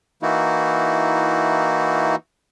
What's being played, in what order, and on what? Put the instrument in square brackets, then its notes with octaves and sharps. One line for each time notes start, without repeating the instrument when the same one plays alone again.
[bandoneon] E3 A#3 D#4 E4 F#4